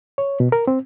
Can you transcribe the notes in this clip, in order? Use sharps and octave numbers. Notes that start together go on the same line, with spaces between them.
C#5
B2
A#4
C4